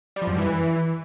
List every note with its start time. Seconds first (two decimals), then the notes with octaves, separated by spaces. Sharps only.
0.16 G3
0.22 F3
0.27 F#2
0.33 G3
0.38 E3